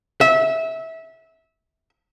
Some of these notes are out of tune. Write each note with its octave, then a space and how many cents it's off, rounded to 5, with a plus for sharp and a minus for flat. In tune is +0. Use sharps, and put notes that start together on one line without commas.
E5 -20